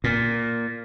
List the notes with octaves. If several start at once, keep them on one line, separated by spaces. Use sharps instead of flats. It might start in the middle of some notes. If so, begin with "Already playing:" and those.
A#2